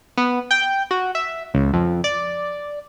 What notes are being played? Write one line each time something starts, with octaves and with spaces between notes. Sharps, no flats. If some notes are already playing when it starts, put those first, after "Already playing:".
B3
G5
F#4
E5
C#2
F2
D5